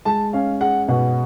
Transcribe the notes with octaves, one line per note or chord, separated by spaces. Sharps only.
G#3 A5
C#4 F5
G#4 F#5
B2 F#5